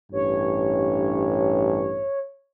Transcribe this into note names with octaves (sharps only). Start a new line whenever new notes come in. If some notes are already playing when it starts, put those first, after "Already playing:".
A1 G2 C#5